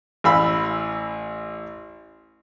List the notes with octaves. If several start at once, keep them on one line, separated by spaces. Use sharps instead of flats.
A1 F5 B5 E6